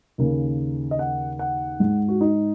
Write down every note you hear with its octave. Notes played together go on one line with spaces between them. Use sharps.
D#2 C#3 A#3
D#5
F#5
F#5
G#2 G#3
F#4
D#4